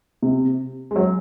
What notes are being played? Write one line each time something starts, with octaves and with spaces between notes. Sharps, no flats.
C3
G#3
F#3